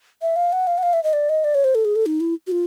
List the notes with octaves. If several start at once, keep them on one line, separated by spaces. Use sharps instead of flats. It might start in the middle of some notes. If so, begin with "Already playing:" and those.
E5
F5
F#5
F5
F#5
F5
E5
D#5
D5
D#5
D5
C#5
C5
A4
G#4
A4
D#4
E4
F#4
F4